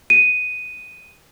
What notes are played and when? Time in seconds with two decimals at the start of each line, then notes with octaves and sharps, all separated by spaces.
0.10 D#7